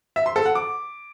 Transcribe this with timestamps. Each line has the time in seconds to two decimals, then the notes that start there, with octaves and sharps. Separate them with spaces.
0.16 E5
0.26 C6
0.36 A4
0.46 F#5
0.55 D6